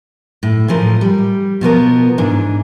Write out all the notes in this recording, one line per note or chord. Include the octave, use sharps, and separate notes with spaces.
A2
A2 E3 F3 A#4
G3
B2 F3 B3 A#4
G#2 E3 D4